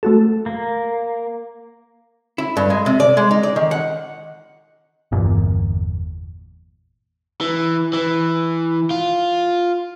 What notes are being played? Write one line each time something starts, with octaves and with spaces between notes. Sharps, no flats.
A3 F#4 A4
A#3
E4
G2
G#3
C3
D5
G#3
D#4
D5
D#3
F#5
G1 E2 A#2
E3
E3
F4